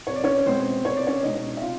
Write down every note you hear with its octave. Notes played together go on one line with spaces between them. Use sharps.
C2 C#5
D5
C#4 C#5
B2 G#3 B3 C4 C5
C2 C#5
D5
C#4 C#5
B2 G#3 B3 D#4 D#5
E5
C3 F4 F5